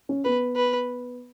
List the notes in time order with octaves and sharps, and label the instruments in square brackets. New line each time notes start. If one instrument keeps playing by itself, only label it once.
[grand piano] C#4
[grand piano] B3 [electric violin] B4
[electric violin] B4